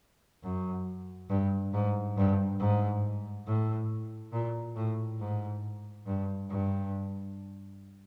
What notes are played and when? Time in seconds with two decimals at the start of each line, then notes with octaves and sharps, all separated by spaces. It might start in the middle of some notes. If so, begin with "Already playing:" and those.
0.43 F#2
1.30 G2
1.74 G#2
2.17 G2
2.60 G#2
3.47 A2
4.33 A#2
4.76 A2
5.19 G#2
6.06 G2
6.49 G2